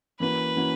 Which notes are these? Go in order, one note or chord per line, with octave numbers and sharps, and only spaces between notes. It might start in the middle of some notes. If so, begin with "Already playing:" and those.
E3 A#3 C#4 F#4 B4
E3 A#3 C#4 F#4